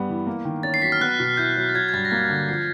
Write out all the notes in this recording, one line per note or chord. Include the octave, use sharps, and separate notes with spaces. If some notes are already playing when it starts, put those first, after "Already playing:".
Already playing: G2 G3 B3
E3
A#3
D#3
C#4 A6
C7
F#3 B6
F6
B3 F#6
B2
E4 G6
F#3
A6
F#3 G#6
G#6
G2 A6
A#6
A#3 A6
D3
F3 C7